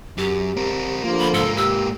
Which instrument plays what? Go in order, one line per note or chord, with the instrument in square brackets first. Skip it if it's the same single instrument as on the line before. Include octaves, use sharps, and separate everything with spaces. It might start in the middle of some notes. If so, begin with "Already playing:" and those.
[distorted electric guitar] F#2 [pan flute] G4
[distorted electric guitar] C4 A#4
[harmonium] D3 F3 F4 [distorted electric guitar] A#3
[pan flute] B5
[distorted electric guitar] G#2 A#3 [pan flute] A4
[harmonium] G4 [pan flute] E6